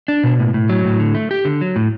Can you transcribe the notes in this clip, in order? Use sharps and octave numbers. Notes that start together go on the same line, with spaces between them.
D4
B2
A2
A2
F#3
A2
D3
A3
G4
D3
F#3
A2